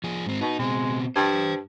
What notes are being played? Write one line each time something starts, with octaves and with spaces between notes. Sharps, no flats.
F3 G#4
G#2 C4
B2 D#4
B2 G#3 C4
G2 C5 A5